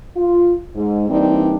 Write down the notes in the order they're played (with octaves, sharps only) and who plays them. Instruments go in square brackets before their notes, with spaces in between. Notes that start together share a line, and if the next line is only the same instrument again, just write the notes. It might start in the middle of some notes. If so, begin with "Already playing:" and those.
[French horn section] F4
G#2
E3 G3 A#3 C4 D4 D#4